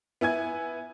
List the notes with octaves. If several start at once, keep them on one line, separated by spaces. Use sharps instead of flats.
B3 E4 G#5 G#6